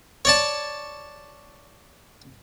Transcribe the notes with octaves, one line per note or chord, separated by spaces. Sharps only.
C#5 D5 A5